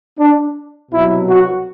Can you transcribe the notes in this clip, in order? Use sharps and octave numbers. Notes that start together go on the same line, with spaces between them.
D4
C2 B2 F#3 E4
F#4